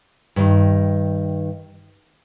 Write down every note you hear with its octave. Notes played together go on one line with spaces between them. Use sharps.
G2 D#3